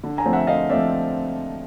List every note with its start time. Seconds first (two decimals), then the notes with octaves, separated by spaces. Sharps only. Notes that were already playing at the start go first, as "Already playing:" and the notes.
0.04 D3
0.18 G#5 A#5
0.25 F3 A3 C4
0.33 E5 F#5
0.47 D3 D#5 F5
0.70 F3 A3 C4 D5 E5